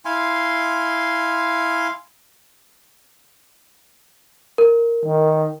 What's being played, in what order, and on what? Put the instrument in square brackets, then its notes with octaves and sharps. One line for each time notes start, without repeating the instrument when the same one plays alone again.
[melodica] E4 F5 G#5 C6
[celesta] A#4
[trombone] D#3